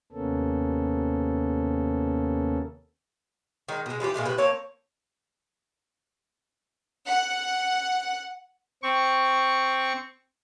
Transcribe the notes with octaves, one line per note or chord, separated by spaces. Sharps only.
D#2 C3 A#3 B3 C#4 A4
D#3 G#3 D#4
B2 G#3
E3 G3 F4 G4
A#2 C#3 G#3 A3
A2 C3 B4
A#3 C4 C#5 A5
F#5
C4 C#6